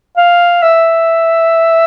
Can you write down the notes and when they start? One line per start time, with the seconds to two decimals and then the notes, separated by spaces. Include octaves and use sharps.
0.17 F5
0.62 E5